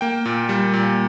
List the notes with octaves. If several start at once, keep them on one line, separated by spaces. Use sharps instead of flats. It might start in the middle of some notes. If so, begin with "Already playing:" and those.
A#3 G5
A#2
G3
A#2